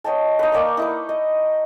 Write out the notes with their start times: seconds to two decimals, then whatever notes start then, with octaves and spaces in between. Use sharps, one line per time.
0.04 C#5 D#5 G5 A5
0.39 D#4 B4
0.52 A#3 D5 G5 C#6
0.77 D#4 E4 B4
1.09 D#5